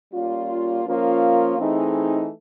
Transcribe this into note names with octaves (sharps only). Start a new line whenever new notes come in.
G3 A#3 C#4 F4
F3 A#3 C#4 F4 A#4
E3 A3 C4 D#4 G#4